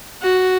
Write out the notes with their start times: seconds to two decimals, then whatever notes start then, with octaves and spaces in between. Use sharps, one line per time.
0.21 F#4